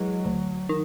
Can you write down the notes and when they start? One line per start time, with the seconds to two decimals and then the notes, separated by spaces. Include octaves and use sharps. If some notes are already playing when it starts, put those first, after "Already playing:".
Already playing: E3 F#3 G#3
0.25 D2
0.69 D#3